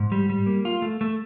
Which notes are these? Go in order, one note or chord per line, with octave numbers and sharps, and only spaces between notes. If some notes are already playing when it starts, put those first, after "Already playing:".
Already playing: G#2
G3
G3
A#3
F4
A3
A3